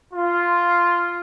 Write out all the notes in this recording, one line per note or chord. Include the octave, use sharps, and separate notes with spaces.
F4